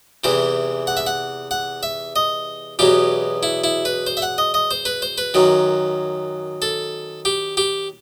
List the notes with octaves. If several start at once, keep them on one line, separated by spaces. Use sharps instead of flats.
E2 C3 E3 C5
F#5
E5
F#5
F#5
E5
D#5
E2 B2 F#3 G4
E4
E4
B4
C5
E5
F#5
D#5
D#5
C5
B4
C5
B4
F#2 D#3 F#3
A4
G4
G4